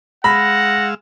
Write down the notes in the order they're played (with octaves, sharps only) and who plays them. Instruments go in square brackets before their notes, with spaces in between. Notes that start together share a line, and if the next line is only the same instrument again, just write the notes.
[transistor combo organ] G#3 F5 E6 [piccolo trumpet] F#5 [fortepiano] B5 [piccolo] A#6